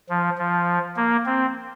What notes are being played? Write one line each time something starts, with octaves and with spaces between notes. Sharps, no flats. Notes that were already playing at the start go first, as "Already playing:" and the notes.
F3
F3
A#3
C4